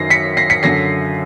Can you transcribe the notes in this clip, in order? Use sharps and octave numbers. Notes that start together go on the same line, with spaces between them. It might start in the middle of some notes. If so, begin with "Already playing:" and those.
Already playing: F#2 D#3 F#3 A#6 C7
B6 C#7
A#6 C7
B6 C#7
F#2 D3 F#3 A#6 C7